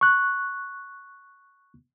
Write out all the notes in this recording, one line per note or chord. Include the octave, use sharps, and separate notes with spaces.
C#6 F#6